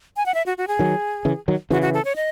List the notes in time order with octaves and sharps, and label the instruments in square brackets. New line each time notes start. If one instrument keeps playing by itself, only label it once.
[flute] G#5
F#5
E5
F#4
F#4
G#4
[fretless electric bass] D#3 F#3
C#3 E3
D#3 F#3
[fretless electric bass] C#3 E3 [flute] F#4
[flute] F#4
A4
C#5
D#5